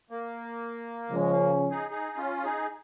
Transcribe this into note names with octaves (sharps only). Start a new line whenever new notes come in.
A#3
C#3 F3 G#3 C#4
A#3
D#4 G#4
D#4 G#4
C#4 F4
D#4 G#4